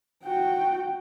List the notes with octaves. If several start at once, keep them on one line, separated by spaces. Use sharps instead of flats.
F#4 G5